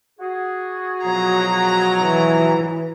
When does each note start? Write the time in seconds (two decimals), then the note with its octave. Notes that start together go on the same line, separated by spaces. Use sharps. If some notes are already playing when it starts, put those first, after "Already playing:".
0.20 F#4 G#4
1.04 B2 F3 F#3 A#5
2.01 E3